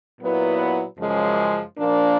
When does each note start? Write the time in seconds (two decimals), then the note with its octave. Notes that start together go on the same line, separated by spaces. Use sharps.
0.19 A#2 F#3 B3 E4
0.98 F#2 C#3 F3 G#3
1.77 A#2 F3 A#3 D4